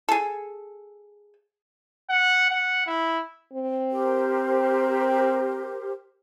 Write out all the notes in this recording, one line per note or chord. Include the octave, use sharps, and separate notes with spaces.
G#4 A4
F#5
F#5
E4
C4
G4 A#4 C5